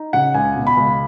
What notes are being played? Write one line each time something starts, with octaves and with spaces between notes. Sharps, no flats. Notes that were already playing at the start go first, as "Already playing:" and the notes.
Already playing: D#4
C#3 F#5
C#2 G#5
B2
B5
C#2